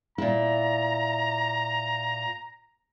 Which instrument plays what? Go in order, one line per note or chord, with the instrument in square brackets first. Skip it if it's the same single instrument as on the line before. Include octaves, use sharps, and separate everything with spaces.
[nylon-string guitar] A#2 E4 [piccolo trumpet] A#5